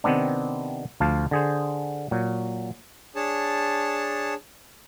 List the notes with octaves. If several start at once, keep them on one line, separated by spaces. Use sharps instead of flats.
C3 D#3 B3 C4 D4
D2 F3 F5 A5
D3 G#4 C5
A#2 F#3
D4 G#4 C#5 A5